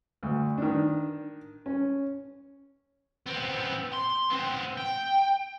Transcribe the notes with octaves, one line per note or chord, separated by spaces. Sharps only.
D2
D#3 D4
C#4
B3 C4
C6
B3 C4
G5